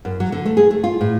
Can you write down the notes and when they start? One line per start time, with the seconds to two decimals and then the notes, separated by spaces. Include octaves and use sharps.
0.05 F#2
0.20 F#3
0.32 D3
0.45 A3
0.57 G#4
0.71 A3
0.84 F4
1.01 A2